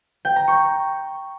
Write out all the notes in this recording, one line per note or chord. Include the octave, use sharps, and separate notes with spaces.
G5
A#5
C#6